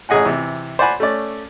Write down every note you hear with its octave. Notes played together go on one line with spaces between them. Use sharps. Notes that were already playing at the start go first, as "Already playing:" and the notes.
A1 C#4 G#4 D#5 F#5 G#5
C3 E3
C5 D5 F#5 G#5 B5 C6
A3 C#4 D5